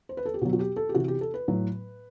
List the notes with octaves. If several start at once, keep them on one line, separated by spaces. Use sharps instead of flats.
C5
B4
A4
G4
B2 F#3 F#4
F#4
G4
A4
G4
C3 E3 F#4
G4
A4
B4
A2 F#3